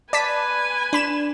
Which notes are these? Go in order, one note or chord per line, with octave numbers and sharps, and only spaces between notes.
B4 D5 G#5 A5 B6
D4 B5 E7